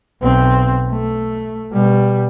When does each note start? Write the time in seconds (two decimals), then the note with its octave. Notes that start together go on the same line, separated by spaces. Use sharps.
0.22 B1 C4
0.91 A3
1.72 B2 G3